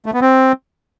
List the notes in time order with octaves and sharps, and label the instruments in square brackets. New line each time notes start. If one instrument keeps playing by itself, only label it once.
[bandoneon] A3
B3
C4